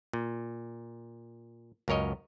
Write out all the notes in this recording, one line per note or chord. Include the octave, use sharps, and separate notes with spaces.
A#2
C#2 F#2 A#4 C#5 D#5